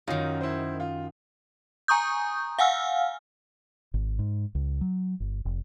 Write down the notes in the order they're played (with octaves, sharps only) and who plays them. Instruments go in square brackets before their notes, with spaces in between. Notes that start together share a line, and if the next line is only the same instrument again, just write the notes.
[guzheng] F#2 D#3 [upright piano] C#4 D#4 F4
[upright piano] E4 C5
F4
[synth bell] G#5 A#5 C#6 D#6 G6
F5 F#5 G#5 E6 F6
[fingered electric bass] G#1
G#2
C#2
F#3
G1
F1